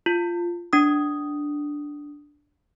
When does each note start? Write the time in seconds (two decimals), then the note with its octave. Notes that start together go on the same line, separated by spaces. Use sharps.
0.06 F4
0.73 D4 D#6